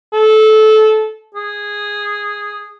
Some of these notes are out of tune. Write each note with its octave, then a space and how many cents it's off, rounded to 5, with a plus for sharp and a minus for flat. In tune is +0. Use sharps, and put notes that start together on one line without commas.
A4 -20
G#4 -10